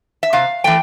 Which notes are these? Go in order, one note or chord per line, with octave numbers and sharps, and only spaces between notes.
E5
C3 F5
E3 A3 G5